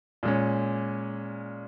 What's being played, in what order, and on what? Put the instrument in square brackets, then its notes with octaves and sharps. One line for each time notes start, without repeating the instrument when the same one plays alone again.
[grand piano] A#2 G#3 C#4